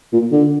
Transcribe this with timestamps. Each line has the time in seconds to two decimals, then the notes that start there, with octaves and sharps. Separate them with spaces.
0.13 A#2
0.32 D3